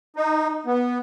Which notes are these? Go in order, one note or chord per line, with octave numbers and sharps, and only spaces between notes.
D#4
B3